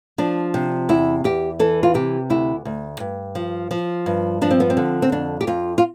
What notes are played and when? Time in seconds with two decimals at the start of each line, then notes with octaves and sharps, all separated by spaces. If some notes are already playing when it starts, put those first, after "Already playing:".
0.18 F3 D4
0.54 C3
0.89 E2 E4
1.24 E2 G4
1.59 E3 A4
1.83 F4
1.94 C3 G4
2.30 D2 E4
2.65 D2
3.00 G2
3.35 F3
3.71 F3
4.06 G2
4.42 F3 D4
4.50 C4
4.60 B3
4.70 C4
4.77 D3
5.02 C4
5.12 F2 D4
5.41 G4
5.47 F2 F4
5.78 F4